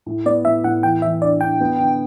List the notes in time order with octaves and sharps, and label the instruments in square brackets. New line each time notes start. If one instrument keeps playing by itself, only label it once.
[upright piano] A2
[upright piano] B3 [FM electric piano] D5
[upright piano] A2 [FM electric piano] E5
[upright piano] A2 [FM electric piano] F#5
[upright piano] E3 [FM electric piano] G5
[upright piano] E3 [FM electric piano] E5
[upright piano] D4 [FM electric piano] D5
[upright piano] D4 [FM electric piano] G5
[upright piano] B3
D3